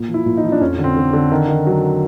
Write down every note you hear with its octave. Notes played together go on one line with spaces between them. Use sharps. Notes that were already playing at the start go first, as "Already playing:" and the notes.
Already playing: A#2
F3
E4
A#2
D#4
F3
D4
F2 C#4
D3
C4
D3
D3
D#3
D#3
F#3